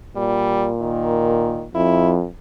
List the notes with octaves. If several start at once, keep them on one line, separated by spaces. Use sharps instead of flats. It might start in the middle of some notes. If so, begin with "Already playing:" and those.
A#2 G3
D#3
F2 E4